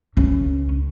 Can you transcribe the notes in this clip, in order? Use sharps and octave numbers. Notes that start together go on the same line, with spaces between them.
C#2 C#4